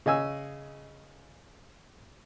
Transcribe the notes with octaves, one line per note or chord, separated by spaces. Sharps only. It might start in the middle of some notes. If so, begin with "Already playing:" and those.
C#3 D#5 G#5 E6